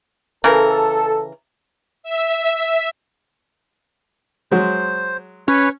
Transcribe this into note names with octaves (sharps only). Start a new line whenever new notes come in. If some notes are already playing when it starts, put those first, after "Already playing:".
C#3 E3 A4 A#4
E5
F#3 G#3 C5
C#4 B4 C#5